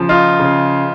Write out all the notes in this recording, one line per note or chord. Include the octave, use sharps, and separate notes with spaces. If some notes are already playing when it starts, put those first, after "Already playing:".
Already playing: C#3 F3
D#4 F4
C#3